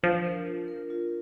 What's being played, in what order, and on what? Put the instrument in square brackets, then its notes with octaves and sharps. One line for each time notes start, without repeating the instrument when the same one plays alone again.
[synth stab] F3 [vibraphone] D4
[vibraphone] A#4
F4
A#4
F4